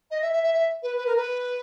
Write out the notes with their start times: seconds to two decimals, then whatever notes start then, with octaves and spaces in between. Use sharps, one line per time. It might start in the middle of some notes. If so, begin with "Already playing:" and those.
0.10 D#5
0.21 E5
0.32 E5
0.43 E5
0.54 E5
0.82 B4
0.96 B4
1.06 A#4
1.16 B4